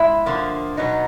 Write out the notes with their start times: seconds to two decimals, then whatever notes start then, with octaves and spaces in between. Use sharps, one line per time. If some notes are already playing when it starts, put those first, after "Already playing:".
Already playing: G#3 E4 E5
0.26 D3 F3 A#3
0.77 B2 F#3 B3 D#4